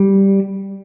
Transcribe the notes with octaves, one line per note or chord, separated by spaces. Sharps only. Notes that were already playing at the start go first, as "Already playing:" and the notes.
Already playing: G3